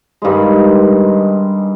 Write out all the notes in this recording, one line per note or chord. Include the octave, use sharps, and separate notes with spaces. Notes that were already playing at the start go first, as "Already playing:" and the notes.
G2 D#3 G#3